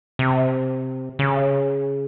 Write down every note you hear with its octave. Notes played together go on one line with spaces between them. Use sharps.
C3
C#3